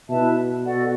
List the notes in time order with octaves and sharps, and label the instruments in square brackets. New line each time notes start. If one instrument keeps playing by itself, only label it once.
[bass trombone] B2 [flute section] E4 B4 E5 A5
[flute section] F#4 A4 D5 F#5